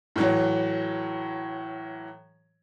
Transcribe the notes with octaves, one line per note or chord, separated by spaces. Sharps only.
A2 E3 F#3